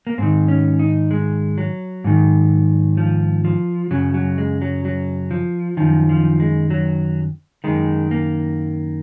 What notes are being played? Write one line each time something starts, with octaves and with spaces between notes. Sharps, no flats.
A#3
G#2 D#3 C4
C#4
D#4
G#3
F#3
G#2 D#3
F3
F3
F#2 C#3 F#3
F#3
G#3
F#3
F#3
F3
F#2 D#3 F3
F3
G#3
F#3
F#2 D#3 G#3
A#3